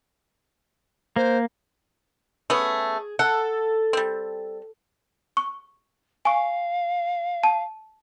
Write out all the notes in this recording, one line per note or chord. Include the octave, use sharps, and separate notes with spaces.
A#3 C5
A3 B3 C#4 G#4
A4 F#5
G3 C4
C#6
F5 G#5 C#6
A5